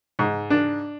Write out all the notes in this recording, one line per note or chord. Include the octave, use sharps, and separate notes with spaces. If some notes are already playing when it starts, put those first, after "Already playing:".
G#2
D4